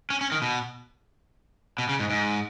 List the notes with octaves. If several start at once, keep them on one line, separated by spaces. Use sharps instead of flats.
C#4
C#4
D#3
B2
B2
C#3
G#2
G#2